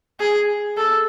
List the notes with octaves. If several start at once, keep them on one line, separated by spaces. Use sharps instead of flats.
G#4
A4